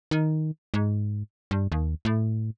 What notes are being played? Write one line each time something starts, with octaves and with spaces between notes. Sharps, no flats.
D#3
G#2
G2
D#2
A2